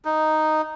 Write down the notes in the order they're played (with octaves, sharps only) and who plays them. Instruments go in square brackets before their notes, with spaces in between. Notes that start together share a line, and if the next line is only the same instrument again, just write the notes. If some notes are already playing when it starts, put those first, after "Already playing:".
[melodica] D#4